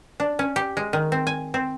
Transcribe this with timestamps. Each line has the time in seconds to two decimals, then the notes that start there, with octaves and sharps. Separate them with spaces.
0.20 D4
0.39 C#4
0.56 G4
0.77 G#3
0.93 D#3
1.12 C4
1.27 G#5
1.54 C4